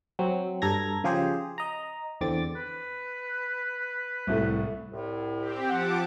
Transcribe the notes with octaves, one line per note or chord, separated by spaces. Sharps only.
F#3 C4
G2 A4 A#5 G#6 A#6
C#3 F3 F4 G4 G#4 C5
D#5 A#5
E2 D3 C4 D6 A6
B4
C2 A2 A3
C2 A2
C4 G4
F3 F#5 A5 D6